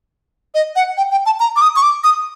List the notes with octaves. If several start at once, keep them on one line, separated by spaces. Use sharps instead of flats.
D#5
F#5
G5
G5
A5
A#5
D6
D#6
C#6
D6
D#6